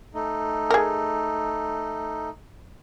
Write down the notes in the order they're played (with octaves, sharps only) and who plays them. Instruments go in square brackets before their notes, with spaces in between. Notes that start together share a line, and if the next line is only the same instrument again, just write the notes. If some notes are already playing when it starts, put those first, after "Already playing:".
[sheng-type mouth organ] A3 D#4
[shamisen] G#4 A#4